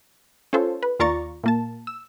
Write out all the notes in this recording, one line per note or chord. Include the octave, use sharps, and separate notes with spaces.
C#4 F4 A4 C5 C#5
B4
D#2 F4 D5 A#5 C#6 A6
A#2 A#3 A5
E6